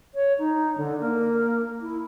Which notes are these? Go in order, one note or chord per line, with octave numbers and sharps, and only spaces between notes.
C#5
D#4
D3
A#3
E4